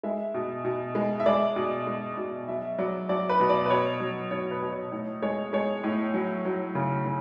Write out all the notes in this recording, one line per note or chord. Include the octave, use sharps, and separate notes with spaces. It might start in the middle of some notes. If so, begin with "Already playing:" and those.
G#3 E5
B2
B2
G#3
E5
G#3 D5
B2
G#3
B2
F#3 E5
F#3 D5
F#3 D5
B4
B2
D5
B4
B2 C#5
F#3
B2 C#5
B4
B2
C#5
A2 C#5
G#3 C#5
G#3 C#5
A2
F#3
F#3
C#3
C#3